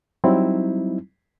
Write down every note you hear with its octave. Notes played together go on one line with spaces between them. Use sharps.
F#3 G3 C4 D#4 E4